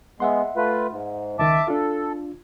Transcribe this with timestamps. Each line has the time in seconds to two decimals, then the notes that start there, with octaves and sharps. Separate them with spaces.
0.20 G#3 B3 E5 F#5 C6
0.56 A3 F4 B4
0.90 G#2
1.39 C#2 D#3 E5 A5 D6
1.68 D4 F4 A4